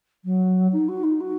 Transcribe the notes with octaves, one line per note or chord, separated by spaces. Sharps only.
F#3
D#4
F#4
D#4
F#4